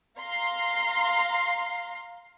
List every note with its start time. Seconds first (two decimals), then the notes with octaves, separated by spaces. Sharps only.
0.18 F5 A#5 C6 C7